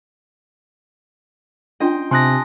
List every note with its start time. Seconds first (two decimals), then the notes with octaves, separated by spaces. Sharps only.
1.80 C#4 D4 F4 D#5 G5 C6
2.11 C3 G#5 A5 C6 D#6 F#6 A#6